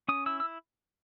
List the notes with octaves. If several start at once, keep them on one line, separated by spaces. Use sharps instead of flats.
C#4 D#6
E4 E6
E6